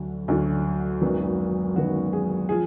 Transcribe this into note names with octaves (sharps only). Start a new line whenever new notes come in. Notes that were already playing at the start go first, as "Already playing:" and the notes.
Already playing: D2 D3 F#3
D2 D3 F#3
G#1 F#2 D#3 F#3 B3
G#1 F#2 D#3 F#3 B3 F#4
G#4
F3 G#4